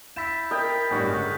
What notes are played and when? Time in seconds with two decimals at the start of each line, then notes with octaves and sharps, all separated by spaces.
0.16 E4 G6 A6 B6 E7
0.51 A#4 D#5 G5 D#6
0.91 G1 A2 G3 C#4 F#4 G6
1.07 C#3 G#3 F#4